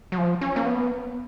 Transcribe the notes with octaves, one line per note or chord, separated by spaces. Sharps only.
F#3
F3
C#4
A#3
B3